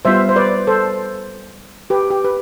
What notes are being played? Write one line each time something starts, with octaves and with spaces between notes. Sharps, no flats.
G3 B3 F4 C5 E5
C5
B4 D5
A4 C5
G4 B4
G4
B4